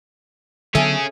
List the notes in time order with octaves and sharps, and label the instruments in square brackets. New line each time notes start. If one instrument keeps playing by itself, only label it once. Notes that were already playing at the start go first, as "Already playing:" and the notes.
[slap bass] D3 F#3 B3 [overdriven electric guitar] C#4 G#4 [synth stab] A4 E5 G#5